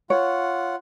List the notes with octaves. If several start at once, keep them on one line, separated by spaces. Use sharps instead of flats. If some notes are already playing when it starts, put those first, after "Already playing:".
F4 C#5 F#5